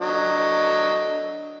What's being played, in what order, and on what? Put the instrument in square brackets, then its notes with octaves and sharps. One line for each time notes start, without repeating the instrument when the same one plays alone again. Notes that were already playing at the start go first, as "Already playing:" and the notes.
[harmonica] D3 F#3 D#5